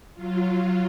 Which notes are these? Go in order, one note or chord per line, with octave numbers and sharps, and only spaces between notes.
F#3 F4